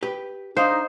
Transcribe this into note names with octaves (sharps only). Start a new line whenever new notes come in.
G4 B4
D4 D#4 C5 F5